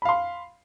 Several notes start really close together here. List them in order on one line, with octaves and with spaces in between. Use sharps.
B5 F5 C6